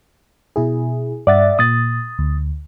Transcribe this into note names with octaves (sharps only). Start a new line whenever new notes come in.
B2 E4 G#4
G2 D5 E5 F#5 A6
A#2 D#6 A6
D2